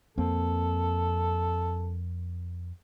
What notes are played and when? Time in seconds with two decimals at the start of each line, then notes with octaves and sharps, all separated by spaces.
0.18 F2 A#3 C4 A4